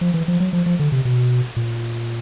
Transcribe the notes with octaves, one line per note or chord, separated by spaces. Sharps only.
F3
E3
F3
F#3
F3
F3
D3
C3
B2
A#2